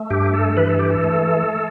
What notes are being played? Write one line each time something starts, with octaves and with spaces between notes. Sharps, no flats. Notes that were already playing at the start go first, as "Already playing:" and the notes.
Already playing: A3
G2 G4
A4
E3 B4
A4
G4
A4
A3